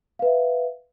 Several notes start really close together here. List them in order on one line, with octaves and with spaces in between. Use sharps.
F5 B4 E5